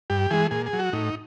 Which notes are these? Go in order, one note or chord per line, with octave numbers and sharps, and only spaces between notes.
G2 G4
E3 G#3 G#4
A#2 G#4
G#4
F#3
F#4
A2 D#4